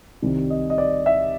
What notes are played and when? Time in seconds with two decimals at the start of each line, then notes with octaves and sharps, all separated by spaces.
0.22 C2 C3 D#3 G3
0.50 D#5
0.70 D#5
0.78 D5
1.06 E5